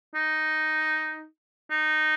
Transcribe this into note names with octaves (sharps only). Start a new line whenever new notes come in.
D#4
D#4